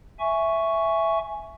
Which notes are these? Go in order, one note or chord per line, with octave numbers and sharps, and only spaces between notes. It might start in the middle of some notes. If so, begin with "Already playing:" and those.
E5 G#5 C#6